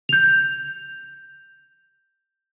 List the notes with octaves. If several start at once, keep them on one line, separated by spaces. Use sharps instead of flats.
G6 F7